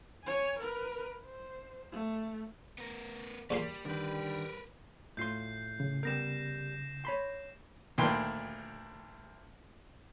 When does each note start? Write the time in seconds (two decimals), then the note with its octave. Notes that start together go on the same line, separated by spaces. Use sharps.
0.24 C#5 G#5
0.60 A#4 B4
1.26 C5
1.92 A3
2.78 B3 A#4
3.50 E2 A#2 G3 C6
3.85 D3 D#3 G3 A#4 B4
5.17 A2 F4 C6 G6 C7
5.80 C#3
6.03 G3 B3 A#4 G6 A#6 E7
7.05 C#5 B5 C6
7.98 D2 A#2 D#3 B4 G5 C6